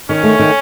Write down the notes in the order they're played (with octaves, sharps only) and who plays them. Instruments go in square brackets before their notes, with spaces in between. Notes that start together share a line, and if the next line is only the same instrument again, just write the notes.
[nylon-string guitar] D#3 [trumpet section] C#4
[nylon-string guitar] A3
D#3